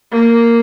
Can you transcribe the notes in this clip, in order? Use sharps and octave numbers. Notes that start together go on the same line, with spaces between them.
A#3